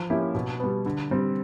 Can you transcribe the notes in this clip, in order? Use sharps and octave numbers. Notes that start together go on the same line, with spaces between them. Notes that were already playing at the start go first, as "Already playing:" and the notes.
Already playing: F3
A#3 C#4 E4 G4
B2
G3 B3
D3
G3 C4